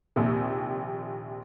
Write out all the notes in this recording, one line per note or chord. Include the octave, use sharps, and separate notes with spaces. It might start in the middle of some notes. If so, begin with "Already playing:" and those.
A#1 D#2 C3